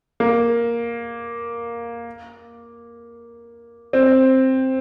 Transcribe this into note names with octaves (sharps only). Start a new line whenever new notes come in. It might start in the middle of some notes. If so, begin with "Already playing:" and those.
A#3
C4